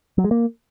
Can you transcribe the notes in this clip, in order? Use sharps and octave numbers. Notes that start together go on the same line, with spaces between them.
F#3
G#3
A#3